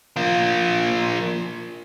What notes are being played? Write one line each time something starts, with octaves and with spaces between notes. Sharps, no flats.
F3 A#3